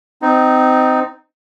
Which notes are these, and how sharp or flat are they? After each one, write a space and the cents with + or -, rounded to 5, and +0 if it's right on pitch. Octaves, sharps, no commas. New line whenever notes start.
C4 -25 D#4 +0